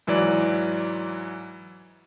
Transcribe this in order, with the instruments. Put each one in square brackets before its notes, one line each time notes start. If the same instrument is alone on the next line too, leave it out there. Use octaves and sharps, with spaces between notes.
[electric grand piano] G#2 E3 F#3 D5